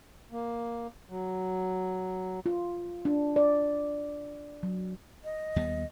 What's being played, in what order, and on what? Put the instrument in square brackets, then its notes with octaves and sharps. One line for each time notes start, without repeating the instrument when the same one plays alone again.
[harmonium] A#3
F#3
[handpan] F4
D4
D5
F#3
[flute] D#5
[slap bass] D#2 G3 B3